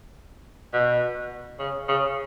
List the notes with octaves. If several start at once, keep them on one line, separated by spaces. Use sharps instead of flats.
B2
C#3
C#3